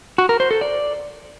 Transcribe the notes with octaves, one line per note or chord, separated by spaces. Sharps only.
F#4
A#4
C5
A4
D5